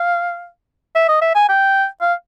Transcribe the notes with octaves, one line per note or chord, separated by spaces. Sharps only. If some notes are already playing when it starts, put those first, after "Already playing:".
Already playing: F5
E5
D#5
E5
G#5
G5
F5